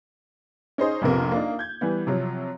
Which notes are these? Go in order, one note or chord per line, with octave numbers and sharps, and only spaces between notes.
C#4 D#4 G#4 C5 D#5
A#1 F2 C3 B3 C4 A#4
A#3 D4 D#4
G6 G#6
E3 G3 B3
C3 F3 F#3